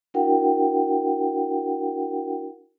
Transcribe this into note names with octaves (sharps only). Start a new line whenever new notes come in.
D4 E4 F#4 A#4 F#5 G5